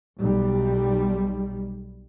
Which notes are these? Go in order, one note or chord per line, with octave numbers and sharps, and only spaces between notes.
B1 G3